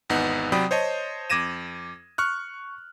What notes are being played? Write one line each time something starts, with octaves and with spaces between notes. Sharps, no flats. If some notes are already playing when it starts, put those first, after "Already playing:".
G#1 E2 B3 D#4 F#5
C3 F#3 D5 G5 B5 D#6
C5 C#5 D#5 A5
F2 D6 G#6 A#6 D#7 E7
C#6 F6 F#6